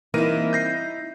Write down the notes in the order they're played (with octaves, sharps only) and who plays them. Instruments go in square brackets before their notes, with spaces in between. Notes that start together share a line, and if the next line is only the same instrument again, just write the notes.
[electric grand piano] E3 A#4 D#7 [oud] G3 A#3 C4 [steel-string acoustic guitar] D#4 E4
[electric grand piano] G6 A#6 C7